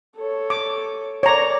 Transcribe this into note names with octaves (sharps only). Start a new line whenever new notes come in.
A4 C#5
D6
A#4 C#5 D5 A#5